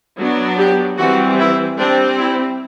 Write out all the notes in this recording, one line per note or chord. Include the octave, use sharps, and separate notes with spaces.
F#3 B3 D4
G4
E3 G3 C4 F#4
E4
G3 C4 D4
E4